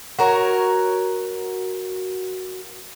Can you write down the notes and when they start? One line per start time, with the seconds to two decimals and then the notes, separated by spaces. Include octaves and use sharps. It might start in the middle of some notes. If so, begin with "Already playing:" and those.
0.19 F#4 A#4 C#5